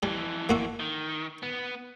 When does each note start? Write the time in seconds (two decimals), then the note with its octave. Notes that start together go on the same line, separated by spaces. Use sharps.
0.03 F2 E3 G3
0.49 A#3 F#4 E5
0.80 D#3
1.43 B3